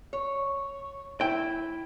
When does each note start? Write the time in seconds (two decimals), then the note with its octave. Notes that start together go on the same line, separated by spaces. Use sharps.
0.13 C#5
1.21 E4 G5